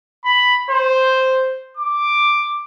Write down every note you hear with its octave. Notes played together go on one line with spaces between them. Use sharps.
B5
C5
D6